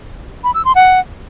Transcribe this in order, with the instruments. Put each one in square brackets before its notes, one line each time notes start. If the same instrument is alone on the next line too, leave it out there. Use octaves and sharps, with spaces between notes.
[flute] B5
E6
C6
F#5